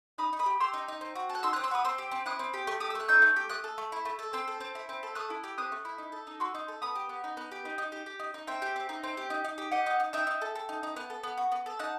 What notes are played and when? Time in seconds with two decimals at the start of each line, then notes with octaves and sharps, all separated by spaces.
0.18 D#4 B5 D#6
0.33 D#4
0.39 B5 D#6
0.46 G4
0.60 G4 C6 E6
0.73 D#4
0.88 D#4
1.01 C4
1.15 F#4
1.29 A4
1.35 F#6
1.43 D#4 C6 E6
1.53 D#6 F#6
1.56 C4
1.63 C6 E6
1.71 F#4 B5 D#6
1.84 C4 C6 E6
1.98 G4
2.11 C4
2.26 E4 D#6 F#6
2.39 C4
2.54 G4
2.67 A3
2.80 G4 D#6
2.90 E6
2.95 A3 F#6
3.08 D#4 E6 G6
3.22 A3
3.36 G4
3.49 A3 D#6 F#6
3.64 A4
3.78 A3
3.92 E4
4.05 A3
4.19 A4
4.33 C4 C6 E6
4.48 A4
4.61 C4
4.75 E4
4.89 C4
5.03 A4
5.15 A3 D#6 F#6
5.30 E4
5.44 G4
5.58 C4 D#6 F#6
5.72 A3
5.85 E4
5.98 D#4
6.12 A4
6.27 D#4
6.40 F#4 C6 E6
6.55 D#4
6.68 A4
6.82 B3 B5 D#6
6.95 G4
7.09 B3
7.24 D#4
7.37 B3
7.52 G4
7.65 D#4
7.78 D#4
7.92 G4
8.06 G4
8.20 D#4
8.34 D#4
8.47 C4 E5 G5
8.62 G4
8.76 C4
8.89 D#4
9.03 C4
9.17 G4
9.30 D#4
9.44 D#4
9.58 G4
9.71 G4 D#5 F#5
9.86 D#4
10.00 D#4
10.13 D#4 E5 G5
10.27 D#4
10.42 A4
10.55 A4
10.69 D#4
10.83 D#4
10.96 B3
11.10 A4
11.23 B3
11.37 F#4
11.52 B3
11.66 A4
11.79 D#4 F#5 A5